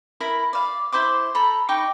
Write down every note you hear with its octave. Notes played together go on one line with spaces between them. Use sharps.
E4 A#4 B5
D5 F5
E4 C5 C6 D6
A4 A#5 B5
D#4 G5 C#6 D6